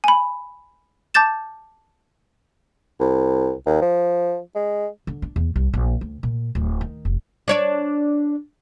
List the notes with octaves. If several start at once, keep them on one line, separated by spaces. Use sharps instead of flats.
G#5 B5
A5 D6 G6 A6 E7
C2
D#2
F3
G#3
D3
D4
E2
C2
A#1
D2
A#2
D1
D#3
F1
D4 C#5 D5